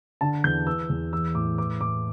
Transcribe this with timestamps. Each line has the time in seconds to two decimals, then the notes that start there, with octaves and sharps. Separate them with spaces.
0.21 D3 A5
0.44 E2 G6
0.67 E3 E6
0.90 E2
1.13 E3 E6
1.35 A2 D6
1.58 E3 D6
1.81 A2 D6